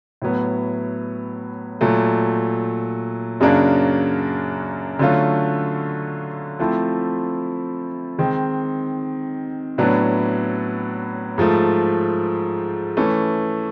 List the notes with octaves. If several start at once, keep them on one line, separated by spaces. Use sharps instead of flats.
A2 F#3 B3
A#2 F#3 A3
F#2 C#3 F#3 A#3 D4
D3 F#3 A3 C#4 F4
F3 A3 C4 E4
D#3 G#3 C4
A2 F#3 B3 D4
G#2 F3 A3
E3 A3 C#4